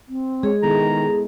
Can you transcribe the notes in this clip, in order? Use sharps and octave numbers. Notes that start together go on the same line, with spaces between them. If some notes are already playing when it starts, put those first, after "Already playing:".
C4
G#3 G#4 C#5
D#3 B3 E4 A4 A#5